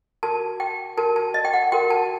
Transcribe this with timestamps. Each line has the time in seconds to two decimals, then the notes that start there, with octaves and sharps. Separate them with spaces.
0.23 F#4 A#4 A5
0.60 G5
0.97 F#4 A#4 A5
1.16 A5
1.34 D#5
1.45 G5
1.53 F#5
1.72 F#4 A#4 G5
1.90 A5